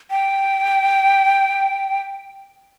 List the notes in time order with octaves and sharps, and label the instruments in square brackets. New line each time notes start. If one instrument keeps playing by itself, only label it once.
[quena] G5